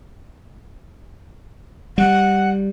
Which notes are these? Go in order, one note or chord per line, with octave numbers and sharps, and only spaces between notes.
G3 F#5